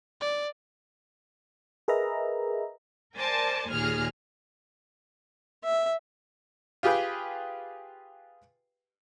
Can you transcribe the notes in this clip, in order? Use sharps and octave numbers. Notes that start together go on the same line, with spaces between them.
D5
G#4 A#4 B4 D#5 E5 A#5
A#4 C5 D5 G#5 A5
D#2 A#2 G#4 F6
E5
F4 G4 G#4 B4 G5